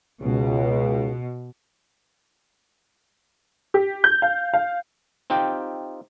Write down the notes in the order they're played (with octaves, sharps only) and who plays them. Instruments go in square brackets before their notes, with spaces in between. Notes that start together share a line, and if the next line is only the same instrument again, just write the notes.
[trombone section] C#2 [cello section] B2
[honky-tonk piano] G4
G6
F5
F5
[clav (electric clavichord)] C4 D#4 F4 G4 G5